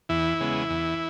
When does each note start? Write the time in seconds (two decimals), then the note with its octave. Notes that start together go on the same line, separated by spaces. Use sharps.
0.09 E2 E3 E4
0.40 C#3 G#3 B3
0.70 E2